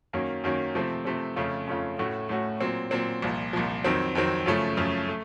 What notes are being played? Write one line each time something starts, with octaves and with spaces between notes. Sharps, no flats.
F#2 D#3 F#3 A#3 C#4
F#2 D#3 F#3 A#3 C#4
C3 F3 A3 C4
C3 F3 A3 C4
F2 C#3 A3 C#4 F4
F2 C#3 A3 C#4 F4
A2 A3 C#4 F#4
A2 A3 C#4 F#4
A#2 F#3 C4
A#2 F#3 C4
C2 A#2 F3
C2 A#2 F3
F2 D#3 F#3 C4
F2 D#3 F#3 C4
F#2 C#3 F3 A3 C#4
F#2 C#3 F3 A3 C#4
A3